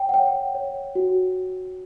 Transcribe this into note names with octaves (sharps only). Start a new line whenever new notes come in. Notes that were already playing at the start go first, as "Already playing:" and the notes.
Already playing: C#5 G5
F#5
C#5 G5
C#5
F#4